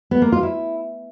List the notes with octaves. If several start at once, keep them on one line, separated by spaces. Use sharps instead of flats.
B3
A#3
F4
E4